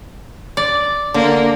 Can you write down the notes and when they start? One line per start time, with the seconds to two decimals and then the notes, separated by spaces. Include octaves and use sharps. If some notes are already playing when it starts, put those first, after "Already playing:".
0.57 D5
1.14 D3 A#3